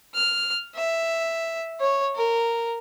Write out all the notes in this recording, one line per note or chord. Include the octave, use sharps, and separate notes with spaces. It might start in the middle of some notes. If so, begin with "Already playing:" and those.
F6
E5
C#5
A#4